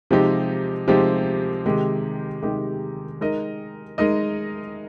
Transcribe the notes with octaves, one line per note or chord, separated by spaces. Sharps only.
C3 F3 G#3 D#4 G4
C3 F3 G#3 D#4 G4
C3 D#3 G#3 D#4 G4
C3 D#3 G#3 D#4 G4
G#3 D#4 A#4 D#5
G#3 D#4 A#4 D#5